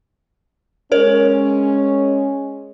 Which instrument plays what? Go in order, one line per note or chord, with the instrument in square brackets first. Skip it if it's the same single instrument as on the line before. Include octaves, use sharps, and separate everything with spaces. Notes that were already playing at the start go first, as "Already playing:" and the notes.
[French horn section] G#3 C#4 [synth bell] A#4 C#5